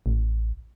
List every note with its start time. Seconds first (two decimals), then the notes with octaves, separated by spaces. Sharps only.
0.06 A1